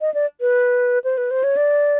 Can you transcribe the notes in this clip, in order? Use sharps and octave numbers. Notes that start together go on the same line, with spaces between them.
D#5
D5
B4
C5
B4
C5
C#5
D5